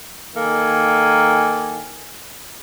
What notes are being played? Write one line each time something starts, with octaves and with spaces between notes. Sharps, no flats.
D#3 A#3 A4 G#5